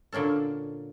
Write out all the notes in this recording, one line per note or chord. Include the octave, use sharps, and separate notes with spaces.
A#2 D3 A#3 C#4 A4